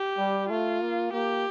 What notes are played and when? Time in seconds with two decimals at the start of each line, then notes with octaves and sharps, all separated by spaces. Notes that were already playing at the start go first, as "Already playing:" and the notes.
Already playing: G4
0.18 G3
0.49 A3 F4
0.81 A#3
1.12 A#3 G4